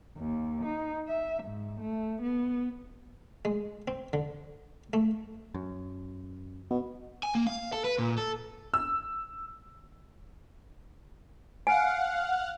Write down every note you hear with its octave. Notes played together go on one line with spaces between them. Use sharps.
D#2
D#4
E5
G#2
A3
B3
G#3
C4
D3
A3
F#2
B2
G#5
A#3
F5
A4
B4
A#2
A4
E6
F5 F#5 G#5